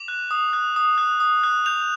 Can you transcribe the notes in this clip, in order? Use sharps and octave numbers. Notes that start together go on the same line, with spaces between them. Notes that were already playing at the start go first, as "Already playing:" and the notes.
Already playing: D6 F7
F#6
D#6
F#6
D#6
F#6
D#6
F#6
G6 F7